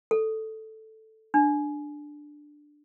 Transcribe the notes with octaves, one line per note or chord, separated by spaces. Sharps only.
A4
D4